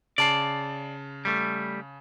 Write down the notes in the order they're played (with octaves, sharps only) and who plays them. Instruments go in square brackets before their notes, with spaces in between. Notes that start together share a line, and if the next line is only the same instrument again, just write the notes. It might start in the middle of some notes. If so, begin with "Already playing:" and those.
[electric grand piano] C#3 A5 C7 [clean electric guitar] D5
[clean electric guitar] G3 A3